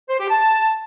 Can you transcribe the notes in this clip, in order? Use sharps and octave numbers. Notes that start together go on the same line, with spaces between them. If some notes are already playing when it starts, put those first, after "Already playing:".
C5
G4
A5